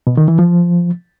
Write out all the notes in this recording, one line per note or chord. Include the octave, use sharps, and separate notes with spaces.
B2
D#3
E3
F3